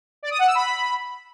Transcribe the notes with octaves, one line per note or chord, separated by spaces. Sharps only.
D5
D#6
F#5
E6
B5